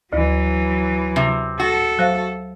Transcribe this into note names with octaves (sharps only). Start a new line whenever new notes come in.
D2 E3 F#3
C3
F#4 A4
F#3 C5 F5